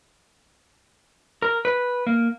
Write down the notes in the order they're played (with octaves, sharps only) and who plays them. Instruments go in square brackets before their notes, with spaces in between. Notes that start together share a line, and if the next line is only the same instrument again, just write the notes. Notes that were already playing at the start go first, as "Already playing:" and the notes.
[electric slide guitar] A#4
B4
A#3